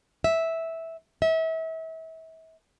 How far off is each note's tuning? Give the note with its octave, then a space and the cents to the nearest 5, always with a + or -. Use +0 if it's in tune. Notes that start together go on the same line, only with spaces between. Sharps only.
E5 -10
E5 -35